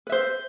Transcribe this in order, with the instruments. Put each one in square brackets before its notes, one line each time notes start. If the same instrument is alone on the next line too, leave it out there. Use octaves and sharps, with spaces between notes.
[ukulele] B4
E5
C5